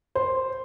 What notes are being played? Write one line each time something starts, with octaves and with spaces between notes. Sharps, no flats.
C5